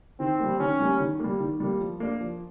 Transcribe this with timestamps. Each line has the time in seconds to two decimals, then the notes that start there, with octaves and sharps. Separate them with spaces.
0.20 D#3 C4
0.40 G3 A#3
0.60 D#3 C#4
0.80 G3 A#3
1.00 D#3
1.20 G3 A#3
1.40 D#3
1.60 G3 A#3
1.80 F3
2.00 A#3 D4
2.20 F3